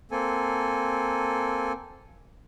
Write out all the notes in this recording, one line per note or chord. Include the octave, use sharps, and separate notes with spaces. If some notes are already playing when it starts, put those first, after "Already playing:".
A#3 C4 A4 G#5